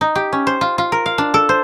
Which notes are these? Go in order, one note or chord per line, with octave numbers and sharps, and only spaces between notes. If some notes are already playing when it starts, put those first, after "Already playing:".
D#4
G4
C#4
C5
F4
F4
A#4
F5
D4
A4
C5